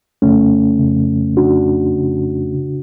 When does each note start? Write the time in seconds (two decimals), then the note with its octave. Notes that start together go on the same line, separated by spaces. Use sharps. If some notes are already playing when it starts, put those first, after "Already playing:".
0.22 F2 C#3 A3 C#4
0.79 F2 C#3
1.37 F2 C#3 D4 F#4
1.95 F2 C#3
2.54 C#3